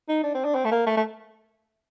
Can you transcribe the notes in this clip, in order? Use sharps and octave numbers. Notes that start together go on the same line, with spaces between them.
D#4
D4
C4
D4
C4
A3
A#3
A3
A3